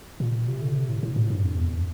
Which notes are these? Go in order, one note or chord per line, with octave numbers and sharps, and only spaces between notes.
A#2
C3
D3
C3
A2
A2
A2
G2
F2
E2